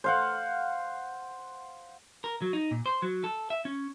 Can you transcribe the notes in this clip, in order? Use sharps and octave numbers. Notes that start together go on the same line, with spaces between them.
C5 F5 F#5
A#4
F#3
D#4
A#2
C5
F#3
A4
E5
C#4